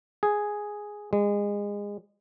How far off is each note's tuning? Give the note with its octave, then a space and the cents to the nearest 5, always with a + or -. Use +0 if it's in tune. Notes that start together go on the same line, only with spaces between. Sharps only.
G#4 +0
G#3 -25